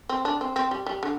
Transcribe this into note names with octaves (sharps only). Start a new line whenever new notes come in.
C4
D4
C4
C4
G3
G3
D3